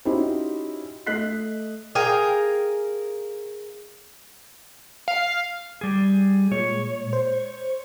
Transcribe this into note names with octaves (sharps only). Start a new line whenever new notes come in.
C#4 D#4 E4 F#4 G4 C5
A3 A4 D#5 F#6 B6 C7
G#4 A#4 F5 G5
F5
G3 G#4
A#2 G#3 C#5
C5